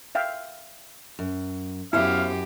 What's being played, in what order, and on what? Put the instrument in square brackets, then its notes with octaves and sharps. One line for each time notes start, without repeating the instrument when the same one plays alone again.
[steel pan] E5 F5 G5
[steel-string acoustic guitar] F#2
[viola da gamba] F#2 G4 [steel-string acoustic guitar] B3 C5 E5 [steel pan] E4 [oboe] F5